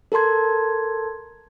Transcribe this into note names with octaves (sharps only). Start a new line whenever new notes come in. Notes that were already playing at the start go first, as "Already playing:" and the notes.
A4 A#4 A5 C6 G#6